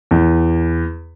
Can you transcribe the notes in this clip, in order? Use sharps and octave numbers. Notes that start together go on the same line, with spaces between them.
E2